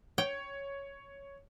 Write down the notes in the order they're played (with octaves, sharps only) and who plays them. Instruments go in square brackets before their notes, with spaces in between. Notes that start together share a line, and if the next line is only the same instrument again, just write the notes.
[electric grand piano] C#5 [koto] G5